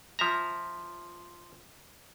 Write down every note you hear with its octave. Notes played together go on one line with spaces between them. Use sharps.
F3 E5 A#5